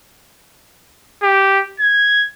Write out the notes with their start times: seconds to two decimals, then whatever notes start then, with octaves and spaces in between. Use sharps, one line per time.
1.23 G4
1.80 G#6